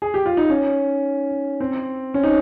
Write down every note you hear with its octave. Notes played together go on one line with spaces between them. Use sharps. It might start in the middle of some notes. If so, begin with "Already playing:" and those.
G#4
G4
F4
D#4
C#4
C4
C#4
D#4